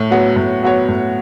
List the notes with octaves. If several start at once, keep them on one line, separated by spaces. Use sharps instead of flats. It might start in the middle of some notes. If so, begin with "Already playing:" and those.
Already playing: A2
F#3 B3 F#4 C#5
A2
F#3 B3 F#4 C#5
A2